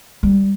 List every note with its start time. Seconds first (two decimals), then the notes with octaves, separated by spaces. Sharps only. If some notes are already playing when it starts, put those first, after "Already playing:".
0.23 G3